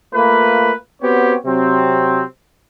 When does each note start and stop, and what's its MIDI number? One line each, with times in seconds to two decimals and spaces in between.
0.14 0.73 57
0.14 0.73 58
0.14 0.73 65
0.14 0.73 71
1.02 1.34 59
1.02 1.34 60
1.02 1.34 66
1.02 1.34 67
1.02 1.34 73
1.45 2.23 48
1.45 2.23 54
1.45 2.23 60